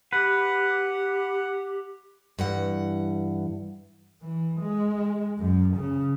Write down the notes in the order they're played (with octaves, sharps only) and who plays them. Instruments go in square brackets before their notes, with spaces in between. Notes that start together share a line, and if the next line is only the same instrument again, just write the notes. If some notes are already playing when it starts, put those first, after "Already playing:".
[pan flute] G4 [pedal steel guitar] B4 [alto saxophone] F#5
[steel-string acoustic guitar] G2 E3 F#5
[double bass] E3
G#3
F#2
C#3